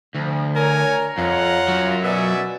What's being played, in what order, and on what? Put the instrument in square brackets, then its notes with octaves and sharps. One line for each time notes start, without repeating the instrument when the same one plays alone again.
[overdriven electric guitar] D2 [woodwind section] F3
[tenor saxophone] A#4 [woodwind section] C#5 A#5 [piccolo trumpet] G#5
[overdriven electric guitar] F2 [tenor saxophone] F4 [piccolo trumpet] F#5
[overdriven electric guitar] F#2 F#3
[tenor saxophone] B2 [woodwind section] D5 F#5 G#5 [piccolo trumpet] E5